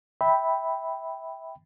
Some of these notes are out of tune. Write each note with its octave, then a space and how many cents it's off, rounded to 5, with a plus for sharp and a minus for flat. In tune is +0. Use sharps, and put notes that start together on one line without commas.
E5 -20 G5 +0 B5 +0